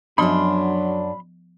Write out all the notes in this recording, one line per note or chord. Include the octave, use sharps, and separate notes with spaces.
F#2 F3 F#3 B3 D4 B5 C6 F6